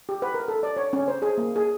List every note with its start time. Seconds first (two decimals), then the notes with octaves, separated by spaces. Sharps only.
0.09 G4
0.22 B4
0.34 A#4
0.48 A4
0.63 D5
0.77 C#5
0.93 C#4
1.08 C5
1.22 G#4
1.38 A#3
1.56 G#4